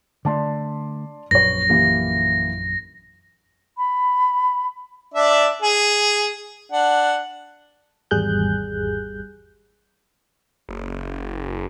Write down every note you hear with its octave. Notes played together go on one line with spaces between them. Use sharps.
D3 A3 D5 A5 C6
A#1 F#2 B4 C#5 A#6
E3 A#3 G4
B5
D4 D5 E5
G#4
D4 F#5
G#1 E2 G3 G#4 F#6 G6
F#1